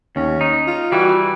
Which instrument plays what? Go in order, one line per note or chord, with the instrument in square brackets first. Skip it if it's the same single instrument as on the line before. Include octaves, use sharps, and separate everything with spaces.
[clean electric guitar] D#2 [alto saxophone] C#4
[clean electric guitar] D#4
[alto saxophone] F4
[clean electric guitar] E3 G3 [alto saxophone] F#4